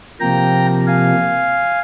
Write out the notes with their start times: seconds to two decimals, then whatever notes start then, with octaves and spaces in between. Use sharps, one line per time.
0.20 C3 F3 A#3 G5 A#5
0.87 F5 G#5